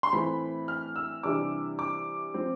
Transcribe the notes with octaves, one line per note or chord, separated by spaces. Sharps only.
C6
A2 E3 A3 C4 B5
F6
E6
C3 E3 G3 D4 D6
D6
F3 C4